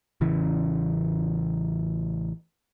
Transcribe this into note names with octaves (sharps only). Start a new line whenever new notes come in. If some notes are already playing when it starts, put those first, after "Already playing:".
A1 C#3 E3 C#4